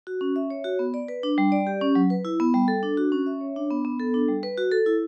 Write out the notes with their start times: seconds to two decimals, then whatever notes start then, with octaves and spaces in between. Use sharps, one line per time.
0.07 F#4
0.21 C#4
0.36 E5
0.50 C#5
0.64 F#4
0.79 B3
0.94 D5
1.08 B4
1.23 D4
1.38 G3
1.52 D5
1.67 G4
1.81 C#4
1.95 F#3
2.10 B4
2.25 E4
2.40 B3
2.54 G3
2.68 A4
2.83 D4
2.97 F#4
3.12 C#4
3.26 E5
3.41 C#5
3.56 D4
3.70 B3
3.85 B3
4.00 A4
4.14 D4
4.28 G3
4.43 B4
4.57 F#4
4.72 A4
4.86 E4